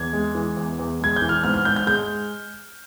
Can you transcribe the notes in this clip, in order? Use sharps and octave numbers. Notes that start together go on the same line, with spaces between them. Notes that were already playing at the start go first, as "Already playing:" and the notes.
Already playing: E2 G#6
G#3
E3
E2
E2
G#3 G#6
G6
E3
F6
G#2 F6
F6
G#2 G6
G6
G#3 G6